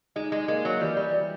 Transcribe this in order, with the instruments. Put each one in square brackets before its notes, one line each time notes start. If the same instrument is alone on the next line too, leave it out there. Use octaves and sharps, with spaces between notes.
[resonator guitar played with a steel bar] G#3 [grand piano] D#4
[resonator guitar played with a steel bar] G#3
[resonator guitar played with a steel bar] G#3 [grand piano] A#3
[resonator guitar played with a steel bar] F#3
[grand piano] E3 [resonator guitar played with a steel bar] G3
[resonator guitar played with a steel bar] G3
[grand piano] G3